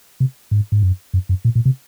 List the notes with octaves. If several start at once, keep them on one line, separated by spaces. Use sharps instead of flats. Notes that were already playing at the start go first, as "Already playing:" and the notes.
C3
G#2
G#2
F#2
F#2
F#2
A#2
A#2
C3